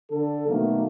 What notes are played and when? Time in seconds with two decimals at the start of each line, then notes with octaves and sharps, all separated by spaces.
0.11 D3 A4
0.48 B2 D#3 F#3 A3 A#3